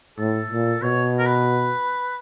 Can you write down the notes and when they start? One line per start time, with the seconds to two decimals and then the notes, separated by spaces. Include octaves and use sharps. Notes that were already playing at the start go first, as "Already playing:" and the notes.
0.18 A2 A4
0.50 A#2
0.82 B2 C#5
1.19 A#4
1.26 B4